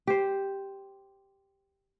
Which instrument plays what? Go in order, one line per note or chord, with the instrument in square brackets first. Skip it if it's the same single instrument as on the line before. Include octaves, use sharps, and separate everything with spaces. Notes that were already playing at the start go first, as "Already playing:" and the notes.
[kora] G4 C5